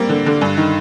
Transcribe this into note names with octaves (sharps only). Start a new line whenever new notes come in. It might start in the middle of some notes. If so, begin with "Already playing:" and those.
Already playing: G3 A#3 C4
D3
D3
G2
D#3